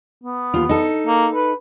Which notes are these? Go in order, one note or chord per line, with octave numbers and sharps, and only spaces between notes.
B3
D#2 F4
D#4 A4
A#3
B4